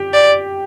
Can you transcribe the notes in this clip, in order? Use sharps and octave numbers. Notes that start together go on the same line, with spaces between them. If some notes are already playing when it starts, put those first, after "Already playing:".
Already playing: G4
D5